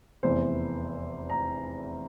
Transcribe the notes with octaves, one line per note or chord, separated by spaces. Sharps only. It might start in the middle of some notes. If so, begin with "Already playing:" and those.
F1 E2 E3 C5
A#5